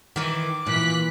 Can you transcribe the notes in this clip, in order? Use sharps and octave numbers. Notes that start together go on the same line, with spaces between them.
D#3 E3 D6
A#2 E3 F#6 B6